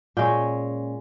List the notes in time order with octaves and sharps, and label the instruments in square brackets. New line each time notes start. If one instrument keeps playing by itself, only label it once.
[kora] A#2 G#3 C#4 G5